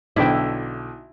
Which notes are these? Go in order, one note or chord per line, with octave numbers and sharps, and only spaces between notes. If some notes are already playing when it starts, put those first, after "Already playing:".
B1 D3 E4 G5